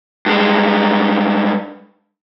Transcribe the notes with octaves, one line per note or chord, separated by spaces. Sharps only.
G2 G#3